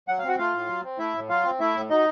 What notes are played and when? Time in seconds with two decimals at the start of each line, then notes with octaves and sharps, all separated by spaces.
0.08 F#3 F#5
0.18 F5
0.24 C4 F#4 F#5
0.38 A3 F4 F5
0.54 A2
0.68 F#3
0.84 C4
0.98 A3 E4 E5
1.15 A2
1.29 F#3 F4 F5
1.45 C4
1.60 A3 E4 E5
1.75 A2
1.90 F#3 D#4 D#5